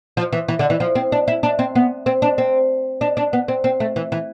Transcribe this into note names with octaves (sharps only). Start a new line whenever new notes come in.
F3
E3
E3
D3
E3
F3
C4
D4
E4
D4
C4
B3
C4
D4
C4
D4
D4
B3
C4
C4
A3
E3
E3